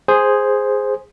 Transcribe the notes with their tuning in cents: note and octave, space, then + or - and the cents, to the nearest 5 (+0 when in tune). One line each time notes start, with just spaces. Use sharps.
G#4 -5 C5 +0